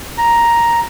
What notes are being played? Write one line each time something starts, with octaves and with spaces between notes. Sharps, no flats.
A#5